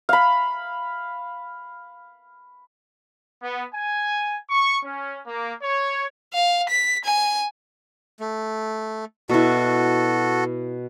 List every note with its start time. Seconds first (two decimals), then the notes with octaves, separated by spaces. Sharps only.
0.09 F5 B5
3.42 B3
3.74 G#5
4.50 C#6
4.84 C#4
5.26 A#3
5.61 C#5
6.33 F5
6.69 B6
7.05 G#5
8.20 A3
9.29 B2 E4 F#4 A4